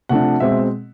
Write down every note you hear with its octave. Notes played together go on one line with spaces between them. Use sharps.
C3 F3 A3 D4 F#5
B2 G#3 C4 E5